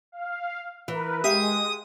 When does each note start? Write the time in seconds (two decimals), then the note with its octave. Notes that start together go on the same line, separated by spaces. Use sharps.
0.12 F5
0.88 E3 A#4 B4
1.24 G#3 G4 E5 F5 D#6